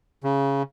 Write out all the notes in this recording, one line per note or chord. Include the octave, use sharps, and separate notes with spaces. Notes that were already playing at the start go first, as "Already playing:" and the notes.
C#3